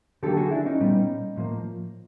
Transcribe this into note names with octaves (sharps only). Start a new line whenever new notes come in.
D3 F#3 A#3 G4 A4
F#4 G#4
D4 E4
C#4 D#4
A#2 G3 B3
A2 F3 A#3